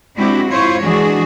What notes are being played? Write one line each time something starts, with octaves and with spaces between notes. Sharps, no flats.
G#3 C4 D4 E4 F#4 G4
E4 F4 C5 C#5
E3 G#3 D4 F#4 G#4